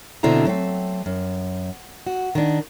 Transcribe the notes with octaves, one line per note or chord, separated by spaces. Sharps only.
B2 D3 C4 D4 E4 A#5
F#3 A3 C4
F#2
F#4
D#3 D4